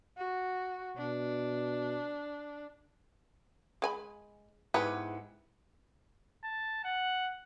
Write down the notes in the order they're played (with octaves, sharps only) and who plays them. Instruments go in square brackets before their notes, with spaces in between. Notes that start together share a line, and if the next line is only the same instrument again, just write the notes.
[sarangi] F#4
[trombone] B2 [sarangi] D4
[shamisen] G#3 G#5 B5
[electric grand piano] G#2 E4 C#7 [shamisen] G#3 B3 G4 [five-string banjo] G#4 B4
[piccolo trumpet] A5
F#5